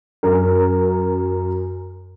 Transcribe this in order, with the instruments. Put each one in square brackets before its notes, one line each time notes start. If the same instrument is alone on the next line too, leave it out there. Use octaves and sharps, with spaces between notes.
[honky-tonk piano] F#2 A#4